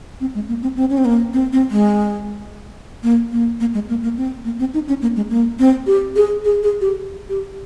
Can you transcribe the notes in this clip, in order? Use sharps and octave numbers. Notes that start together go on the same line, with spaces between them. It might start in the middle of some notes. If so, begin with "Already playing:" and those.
C4
G#3
A#3
C4
C4
C#4
C4
A#3
C4
C4
G#3
A#3
A#3
A#3
G#3
A#3
A#3
C4
A#3
C4
D#4
C#4
A#3
G#3
A#3
C4
G4
G#4
G#4
G#4
G4
G4